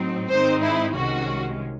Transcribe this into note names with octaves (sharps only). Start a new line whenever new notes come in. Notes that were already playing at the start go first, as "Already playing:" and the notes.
Already playing: A2 F#3 C4 D#4
G#2 D#3 G#3 C4 D#4 C5
E4
C2 C3 D#3 G#3 C#4 F#4